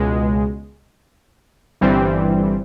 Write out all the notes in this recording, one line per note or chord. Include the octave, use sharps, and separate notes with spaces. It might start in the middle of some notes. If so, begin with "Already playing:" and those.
Already playing: C#2 B2 G#3
G1 G2 E3 G3 C4